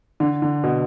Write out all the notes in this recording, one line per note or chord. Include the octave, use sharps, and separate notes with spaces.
D3
D3
B2